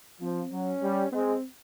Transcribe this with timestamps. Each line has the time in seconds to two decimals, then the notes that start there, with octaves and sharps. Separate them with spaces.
0.21 F3 C4
0.51 F#3 C#4
0.82 G3
1.12 G#3 C4